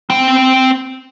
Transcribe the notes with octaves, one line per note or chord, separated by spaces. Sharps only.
C4 G5